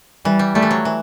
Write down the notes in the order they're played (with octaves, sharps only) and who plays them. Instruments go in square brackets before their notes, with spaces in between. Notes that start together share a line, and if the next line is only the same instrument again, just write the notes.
[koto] E3 [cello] G3
[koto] G3
[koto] G3 [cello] A3
[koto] E3
F#3
E3